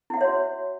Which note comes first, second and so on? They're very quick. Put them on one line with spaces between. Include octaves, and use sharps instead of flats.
E4 F#5 E5 C#5 F#4